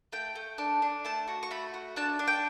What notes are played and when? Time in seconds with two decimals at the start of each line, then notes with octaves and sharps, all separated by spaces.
0.12 A3 G5
0.36 A3
0.58 D4
0.82 D4
1.05 A3 A5
1.28 F#4
1.43 C#6
1.51 A3 B5
1.74 F#4
1.96 D4 A5
2.19 D4
2.28 G5